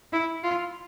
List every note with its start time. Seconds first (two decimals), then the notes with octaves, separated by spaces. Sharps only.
0.13 E4
0.43 F4